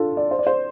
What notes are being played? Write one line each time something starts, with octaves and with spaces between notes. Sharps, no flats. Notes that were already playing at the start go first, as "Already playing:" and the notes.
Already playing: D4 F4 A4
D5
C5
D5
C5